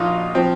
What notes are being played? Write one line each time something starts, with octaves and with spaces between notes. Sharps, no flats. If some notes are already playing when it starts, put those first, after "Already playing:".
Already playing: A#1 A#2 D#4 F4 F#4
F3 C4